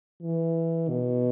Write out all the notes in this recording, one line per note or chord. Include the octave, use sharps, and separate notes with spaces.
E3
B2